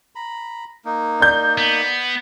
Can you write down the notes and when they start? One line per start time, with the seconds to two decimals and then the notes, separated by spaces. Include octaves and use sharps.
0.15 A#5 B5
0.85 A#3 D#4
1.20 D5 G6
1.58 B3